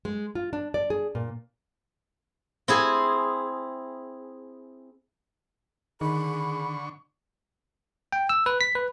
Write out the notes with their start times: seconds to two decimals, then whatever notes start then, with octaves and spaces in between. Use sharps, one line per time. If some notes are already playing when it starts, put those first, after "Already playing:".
0.05 G#3
0.35 F4
0.53 D4
0.74 D5
0.90 G#4
1.15 A#2
2.68 C4 E4 G#4
6.01 D3 D#3 G#4 B5 C#6
8.12 G5
8.29 E6
8.46 B4
8.61 B6
8.75 B4